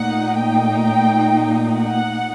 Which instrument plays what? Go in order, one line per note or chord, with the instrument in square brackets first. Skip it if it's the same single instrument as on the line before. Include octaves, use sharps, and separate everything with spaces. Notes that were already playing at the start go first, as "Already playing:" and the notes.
Already playing: [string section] A#2 A3 D#4 F#5
G5
F#5